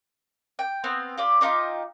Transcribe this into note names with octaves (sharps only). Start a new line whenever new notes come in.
G5
B3 C4 F5
F4 G4 D5
D4 D#4 F4 G4